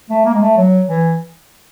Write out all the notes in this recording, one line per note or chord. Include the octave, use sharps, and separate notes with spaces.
A3
A#3
G#3
A3
F#3
E3